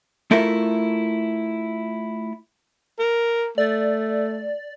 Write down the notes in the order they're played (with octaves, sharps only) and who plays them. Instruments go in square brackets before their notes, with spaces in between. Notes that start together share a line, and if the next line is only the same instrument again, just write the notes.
[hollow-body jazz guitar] A3 E4 F4 A4 A#4 E5
[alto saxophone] A#4
[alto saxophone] A3 [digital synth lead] D5